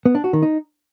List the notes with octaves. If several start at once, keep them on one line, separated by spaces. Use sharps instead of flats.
B3
D4
F#4
D#3
D#4